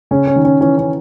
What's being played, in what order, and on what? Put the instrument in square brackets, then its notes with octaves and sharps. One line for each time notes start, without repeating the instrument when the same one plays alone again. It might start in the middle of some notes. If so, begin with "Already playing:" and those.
[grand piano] C#3 [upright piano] C#4
[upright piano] C#4
[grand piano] D#3
[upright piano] C#4
[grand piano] E3 [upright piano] C#4
[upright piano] C#4